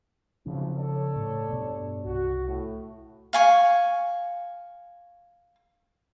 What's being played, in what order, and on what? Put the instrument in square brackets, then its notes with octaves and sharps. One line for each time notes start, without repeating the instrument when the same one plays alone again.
[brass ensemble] B1 F2 G#2 [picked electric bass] C#3 F3 C#4
[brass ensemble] A4 C#5 D5
[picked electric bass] A2
G2 B2
[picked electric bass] C2 [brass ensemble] F#4
[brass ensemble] A2
[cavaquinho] F5 G#5 C#6